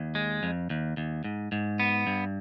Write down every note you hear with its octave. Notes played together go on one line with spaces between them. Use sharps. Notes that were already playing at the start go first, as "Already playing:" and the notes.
Already playing: D#2
G#3
F2
D#2
D#2
G#2
G#2
B3
G2